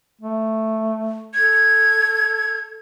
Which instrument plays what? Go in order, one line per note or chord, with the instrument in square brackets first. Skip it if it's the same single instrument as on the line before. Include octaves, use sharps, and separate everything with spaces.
[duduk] A3
[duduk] A4 [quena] G#6